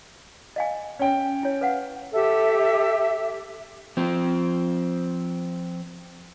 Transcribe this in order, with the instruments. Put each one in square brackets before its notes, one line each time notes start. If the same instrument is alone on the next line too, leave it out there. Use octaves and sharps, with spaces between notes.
[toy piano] D#5 F5 G#5
[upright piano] C#4 G5
[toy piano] E4 C#5
B4 F5 F#5
[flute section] G4 A4 E5
[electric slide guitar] F3 C4